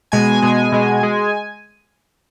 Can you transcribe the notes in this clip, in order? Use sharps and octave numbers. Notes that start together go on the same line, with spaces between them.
B2 G#3 G#5
B2 G#3
B2 G#3
G#3